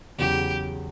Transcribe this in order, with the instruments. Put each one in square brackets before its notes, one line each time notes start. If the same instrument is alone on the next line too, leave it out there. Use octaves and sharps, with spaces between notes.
[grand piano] E2 C#3 F#3 [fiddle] G4